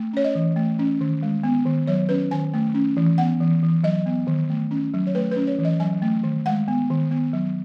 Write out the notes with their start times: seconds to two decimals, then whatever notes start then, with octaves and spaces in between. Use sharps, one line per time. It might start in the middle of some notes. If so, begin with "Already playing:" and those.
Already playing: A3
0.13 C#4 C#5
0.24 D#5
0.35 E3
0.56 A3
0.79 C#4
1.01 D#3
1.23 G#3
1.43 B3
1.65 D#3
1.87 F#3 C#5
2.09 C#4 B4
2.31 D#3 G#5
2.54 A3
2.74 C#4
2.97 E3
3.18 B3 F#5
3.40 E3
3.63 E3
3.84 F#3 D#5
4.06 B3
4.27 D#3
4.50 A3
4.71 C#4
4.94 F#3
5.07 C#5
5.15 A3 B4
5.32 C#4 B4
5.47 C#5
5.59 E3
5.65 D#5
5.80 F#3 G#5
6.02 A3
6.23 D#3
6.46 G#3 F#5
6.68 B3
6.90 D#3
7.11 B3
7.33 F#3